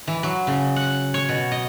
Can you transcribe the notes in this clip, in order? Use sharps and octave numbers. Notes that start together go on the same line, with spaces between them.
E3
F#3
C#3
F#5
C#5
B2
D#5